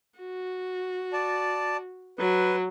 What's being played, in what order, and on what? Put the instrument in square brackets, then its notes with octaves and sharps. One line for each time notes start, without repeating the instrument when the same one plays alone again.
[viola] F#4
[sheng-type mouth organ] D5 A5
[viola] F#3 [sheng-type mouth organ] B4